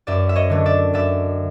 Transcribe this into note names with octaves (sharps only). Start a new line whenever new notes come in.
F#2 D5 E5
E5
C#5 D#5
D3 F#3 A3 D4
D5 E5
F#2 D5 E5